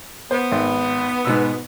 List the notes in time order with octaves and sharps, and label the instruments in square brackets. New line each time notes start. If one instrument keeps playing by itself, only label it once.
[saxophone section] B3 [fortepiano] C5
[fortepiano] G#1
G#2 B2 E6